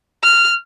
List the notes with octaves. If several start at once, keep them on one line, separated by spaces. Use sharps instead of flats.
F6